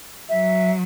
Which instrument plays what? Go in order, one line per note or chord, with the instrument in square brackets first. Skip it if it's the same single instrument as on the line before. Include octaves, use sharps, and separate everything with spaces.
[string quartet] F#3 [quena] E5